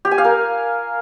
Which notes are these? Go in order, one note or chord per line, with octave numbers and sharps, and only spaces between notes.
G4
G#5
F5
A#4